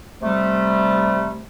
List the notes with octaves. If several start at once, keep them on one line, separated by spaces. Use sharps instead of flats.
C3 G3 A3